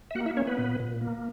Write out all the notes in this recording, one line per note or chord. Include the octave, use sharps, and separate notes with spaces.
E5
A#3 F#4 F#5
E4 E5
C#4 C#5
B3 B4
A#2
A#2
A#3